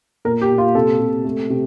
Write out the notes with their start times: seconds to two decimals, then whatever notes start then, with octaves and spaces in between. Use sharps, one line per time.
0.25 A#2 A#4
0.42 G4
0.50 A#2
0.58 F4
0.75 C3 A4
1.00 C3
1.25 A3
1.50 C3